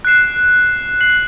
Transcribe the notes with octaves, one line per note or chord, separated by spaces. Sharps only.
F#6 C7 E7
F#6 C7 F#7